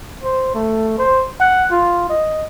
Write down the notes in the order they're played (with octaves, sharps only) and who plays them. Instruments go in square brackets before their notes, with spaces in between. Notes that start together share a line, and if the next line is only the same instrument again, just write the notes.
[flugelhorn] C5
A3
C5
F#5
F4
D#5